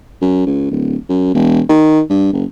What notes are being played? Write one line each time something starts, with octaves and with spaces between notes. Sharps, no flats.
F#2
C#2
D1
F#2
E1
D#3
G2
F#1